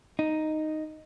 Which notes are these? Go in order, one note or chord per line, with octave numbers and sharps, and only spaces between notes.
D#4